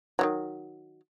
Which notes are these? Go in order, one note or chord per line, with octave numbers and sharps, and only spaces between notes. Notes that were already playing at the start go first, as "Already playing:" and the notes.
D#3 E3 F#3